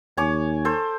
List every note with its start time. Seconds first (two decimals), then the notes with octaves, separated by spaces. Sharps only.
0.17 D#2 C#5 G#5 D6
0.65 A4 C5